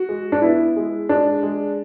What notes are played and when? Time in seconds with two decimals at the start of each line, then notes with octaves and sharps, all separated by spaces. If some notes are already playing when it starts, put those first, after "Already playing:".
Already playing: F#4
0.09 G#3
0.32 D4
0.42 B3 E4
0.77 G#3
1.09 G#3 D4
1.43 G#3